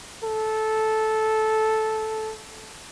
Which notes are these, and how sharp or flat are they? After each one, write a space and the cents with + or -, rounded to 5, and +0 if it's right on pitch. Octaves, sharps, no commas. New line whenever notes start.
A4 -10